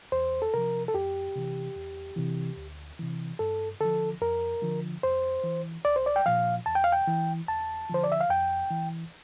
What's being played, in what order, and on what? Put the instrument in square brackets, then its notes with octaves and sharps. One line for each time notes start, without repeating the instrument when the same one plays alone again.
[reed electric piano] E2 C5
A4
C3 F3 A#4
A4
F2 G4
C3 E3
E2
C3 E3
D2
C3 E3
G2 A4
D3 F3 A4
F2 A#4
D3 F3
F2 C5
E3
C2 D5
C5
D5
G5
A#2 F3 F5
E2 A5
G5
F5
G5
E3
E2 A5
D3 F3 C5
D5
E5
F5
F2 G5
E3